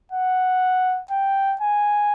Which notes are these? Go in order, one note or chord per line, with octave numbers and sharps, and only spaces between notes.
F#5
G5
G#5